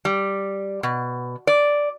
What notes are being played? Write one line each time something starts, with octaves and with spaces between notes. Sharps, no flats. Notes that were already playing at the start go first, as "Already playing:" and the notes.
G3
B2
D5